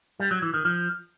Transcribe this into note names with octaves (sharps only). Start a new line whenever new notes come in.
G3
F#3
E3
D#3
F3